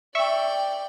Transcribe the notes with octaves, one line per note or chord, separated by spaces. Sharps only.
D5 E5 G5 C#6